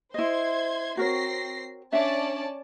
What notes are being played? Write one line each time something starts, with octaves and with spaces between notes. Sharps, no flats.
E4 C5 D#5 C6 G#6
C4 F#4 A#4 C#5 A#6 C7
C#4 D4 D5 E5 A5